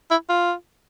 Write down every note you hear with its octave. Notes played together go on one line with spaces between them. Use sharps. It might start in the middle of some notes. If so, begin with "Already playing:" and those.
E4
F4